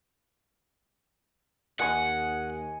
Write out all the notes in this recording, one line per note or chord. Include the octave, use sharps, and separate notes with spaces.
D#2 D#5 F#5 G#5 C#6